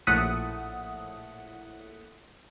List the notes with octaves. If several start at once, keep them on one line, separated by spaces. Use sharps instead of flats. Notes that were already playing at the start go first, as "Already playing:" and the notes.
A#1 A2 A3 F#5 D#6 B6